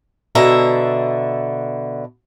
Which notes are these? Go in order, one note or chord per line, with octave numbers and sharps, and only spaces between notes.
B2 D3 E5 A#5